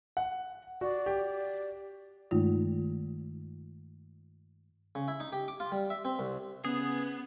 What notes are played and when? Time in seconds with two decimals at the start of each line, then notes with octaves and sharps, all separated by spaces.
0.17 F#5
0.81 F#4 D5
1.06 G4
2.31 G2 D#3 G#3 A3 D#4 F4
4.95 C#3
5.08 E4
5.20 D#4
5.32 G4
5.48 D6
5.60 F4
5.72 G3
5.90 E5
6.05 C4
6.19 C2
6.65 C#3 B3 G#4